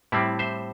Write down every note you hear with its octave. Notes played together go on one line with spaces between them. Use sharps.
A2 G3 C4 E4
C5 E5